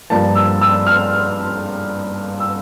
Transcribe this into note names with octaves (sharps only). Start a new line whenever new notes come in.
G2 F3 A#3 A5
E6
E6
F6
E6